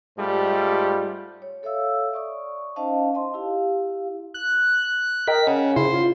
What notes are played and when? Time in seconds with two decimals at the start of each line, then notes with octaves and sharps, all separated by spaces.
0.17 G#2 G3 A3 F4
1.42 C#5
1.63 A4 C#5 E5 F5 E6
2.13 D5 C#6 D#6
2.76 C#4 D#4 C5 D#5 F5 A5
3.14 D#5 A5 C6
3.34 E4 G4 F5
4.34 F#6
5.28 A#4 D#5 G5 B6
5.47 C#3 F#5
5.76 C#3 E4 C5
5.94 F4